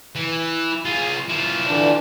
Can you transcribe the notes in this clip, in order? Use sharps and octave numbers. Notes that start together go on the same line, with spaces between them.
E3
F4 G#4
F3 E4
D3 E3 D4